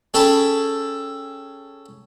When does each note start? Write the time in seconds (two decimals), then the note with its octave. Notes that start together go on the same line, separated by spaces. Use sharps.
0.14 C#4 G#4 A4 G5 A5 B5